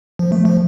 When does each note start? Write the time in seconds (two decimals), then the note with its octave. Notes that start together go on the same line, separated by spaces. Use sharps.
0.19 F3
0.32 A3
0.45 F3